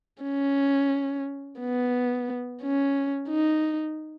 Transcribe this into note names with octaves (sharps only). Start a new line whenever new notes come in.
C#4
B3
C#4
D#4